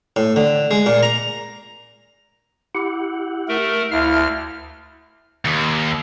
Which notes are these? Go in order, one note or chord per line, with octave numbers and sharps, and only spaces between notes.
A2
D3
G#3
A#2
A#5
E4 G4 F#5
A3 A#4
D2 E4 F5 F6
D#2